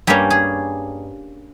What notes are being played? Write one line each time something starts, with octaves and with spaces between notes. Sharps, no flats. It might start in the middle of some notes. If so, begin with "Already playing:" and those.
G2 G3 A#3 C#4 G4
G#4